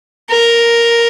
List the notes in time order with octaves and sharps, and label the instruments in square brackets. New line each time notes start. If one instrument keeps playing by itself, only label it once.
[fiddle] A#4